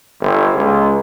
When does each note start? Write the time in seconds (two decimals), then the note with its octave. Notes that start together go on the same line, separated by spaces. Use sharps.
0.20 G1
0.54 C#2